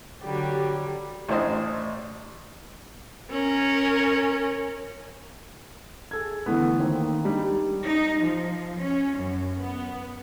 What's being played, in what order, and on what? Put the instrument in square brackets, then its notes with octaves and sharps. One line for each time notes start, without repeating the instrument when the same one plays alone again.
[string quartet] D3 F#3 G3 [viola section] G4
[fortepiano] A1 A2 D4 C5 D#5
[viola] C#4 A#4
[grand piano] G#4 A4 G#6
D3 E3 A3 B3
D#3 A#3 C4
G3 D4 D#4
[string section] D#4
F3
C#4
F#2
B3